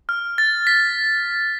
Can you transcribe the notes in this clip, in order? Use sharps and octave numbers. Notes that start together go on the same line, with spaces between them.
F6
A6
B6